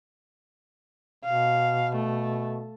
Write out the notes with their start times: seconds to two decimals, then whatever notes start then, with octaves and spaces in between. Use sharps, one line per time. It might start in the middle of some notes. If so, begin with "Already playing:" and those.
1.24 B2 F5
1.96 A3